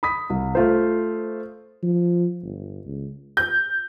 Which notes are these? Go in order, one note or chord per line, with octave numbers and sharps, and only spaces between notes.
B5 D#6 B6
C2
A3 F4 C5
F3
G1
C#2
G6